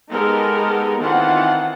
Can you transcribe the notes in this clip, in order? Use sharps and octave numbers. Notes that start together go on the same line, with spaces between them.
G#3 B3 D#4 G4 A4 A#4
D#3 E3 C4 F4 F#5 A5